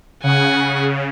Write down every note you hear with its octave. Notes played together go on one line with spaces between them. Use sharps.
C#3 F#5 G#5